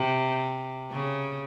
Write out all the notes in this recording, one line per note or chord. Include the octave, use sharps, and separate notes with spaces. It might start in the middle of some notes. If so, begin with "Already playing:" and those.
Already playing: C3
C#3